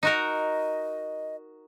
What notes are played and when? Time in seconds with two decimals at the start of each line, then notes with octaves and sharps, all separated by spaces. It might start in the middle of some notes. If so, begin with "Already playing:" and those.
0.03 D#4 F#4 A#4 D#5